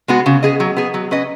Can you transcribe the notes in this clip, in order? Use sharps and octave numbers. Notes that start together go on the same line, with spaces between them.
G#3 B3 F#4
C#3
B3 G#4 D#5
F#3
B3 G#4
F#3
C#4 B4 D#5